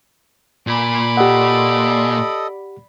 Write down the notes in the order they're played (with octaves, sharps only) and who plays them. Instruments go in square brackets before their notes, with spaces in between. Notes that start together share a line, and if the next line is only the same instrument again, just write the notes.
[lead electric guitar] A#2 [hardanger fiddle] D5 B5
[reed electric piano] G4 F#5 [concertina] A4 D#5